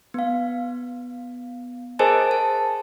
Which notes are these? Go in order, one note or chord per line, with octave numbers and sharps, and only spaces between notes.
B3 F5
G#4 A#4 C5 D#5 G#5 A5
A5